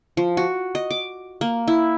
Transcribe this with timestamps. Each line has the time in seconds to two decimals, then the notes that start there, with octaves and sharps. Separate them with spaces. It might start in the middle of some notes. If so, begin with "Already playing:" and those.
0.17 F3
0.37 F#4
0.75 D#5
0.91 D6
1.41 A#3
1.68 E4